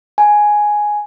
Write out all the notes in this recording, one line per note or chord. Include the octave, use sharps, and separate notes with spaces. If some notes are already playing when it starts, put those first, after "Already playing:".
G#5